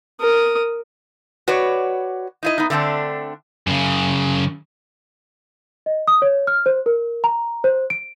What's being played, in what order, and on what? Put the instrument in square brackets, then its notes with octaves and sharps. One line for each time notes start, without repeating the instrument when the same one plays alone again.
[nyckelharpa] A#4 D#6
[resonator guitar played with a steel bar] F#4 B4 C#5 D5
D#4 E4 D#5
B3 D#4
D3 A3 C4 D4
[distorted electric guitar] F#2 C#3
[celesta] D#5
D#6
C#5
F6
C5
A#4
A#5
C5
D7